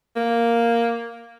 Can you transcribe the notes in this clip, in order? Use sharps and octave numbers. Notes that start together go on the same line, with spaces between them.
A#3